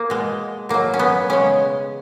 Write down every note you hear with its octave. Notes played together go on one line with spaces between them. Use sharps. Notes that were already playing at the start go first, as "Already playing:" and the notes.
Already playing: A#3
B2 G#3
B2 F#3 A#3
C#4
B3
C#3 G#3 C#4